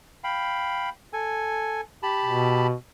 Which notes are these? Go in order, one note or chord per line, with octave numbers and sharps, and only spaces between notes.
F5 G5 B5
A4 G#5
G4 A5 B5
B2